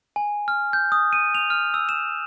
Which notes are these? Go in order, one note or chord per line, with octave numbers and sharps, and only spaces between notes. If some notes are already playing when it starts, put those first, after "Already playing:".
G#5
F6
G6
D#6
D#7
F7
F6
E6
E7